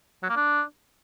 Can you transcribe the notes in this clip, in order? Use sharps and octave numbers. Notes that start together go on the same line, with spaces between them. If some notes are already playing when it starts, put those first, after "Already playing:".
F#3
A#3
D4